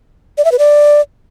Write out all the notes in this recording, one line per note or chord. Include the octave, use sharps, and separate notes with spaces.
D5
E5
B4
D5